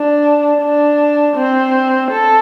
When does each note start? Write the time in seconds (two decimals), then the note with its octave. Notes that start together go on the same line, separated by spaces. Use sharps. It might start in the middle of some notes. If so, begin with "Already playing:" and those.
Already playing: D4
0.61 D4
1.36 C4
2.11 A4